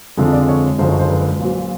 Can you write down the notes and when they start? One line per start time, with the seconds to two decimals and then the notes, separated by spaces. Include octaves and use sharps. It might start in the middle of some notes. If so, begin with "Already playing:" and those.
0.17 F2 D3 F3 G#3
0.32 D5
0.49 C#5
0.79 F#1 F#2 D3 F3 G#3 C5
0.90 C#5
0.99 C5
1.10 B4
1.40 A#1 A#2 F#3